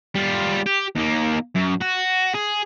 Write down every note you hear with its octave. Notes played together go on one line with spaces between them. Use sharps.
G3 F4
G4
D#2 A#3
F#2
F#4
G#4